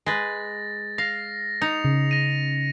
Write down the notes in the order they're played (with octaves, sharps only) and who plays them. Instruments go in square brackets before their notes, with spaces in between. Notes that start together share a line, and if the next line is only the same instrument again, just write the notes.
[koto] G#3 B4 [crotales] A6 A#6
[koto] F5 [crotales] A#6 C7
[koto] D#4 [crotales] C#7 F7
[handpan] C#3
[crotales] A#6 D#7